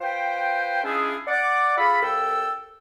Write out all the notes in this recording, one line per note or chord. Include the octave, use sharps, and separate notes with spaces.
F4 B4 C5 G5
G#3 C#4 D4 E4 F4 G#4
D5 F#5 D6
F4 G#4 A4 F5 B5
C2 A4 G5 E6